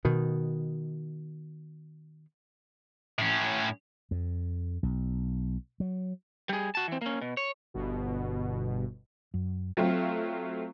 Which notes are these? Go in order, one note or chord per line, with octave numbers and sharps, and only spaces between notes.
B2 D#3
A2 C#4
F2
B1
F#3
G3 G#4
F#4 A5
E3 C4
A#3 C#4
B2
C#5
G1 B2
F#2
F#3 A3 C4 F4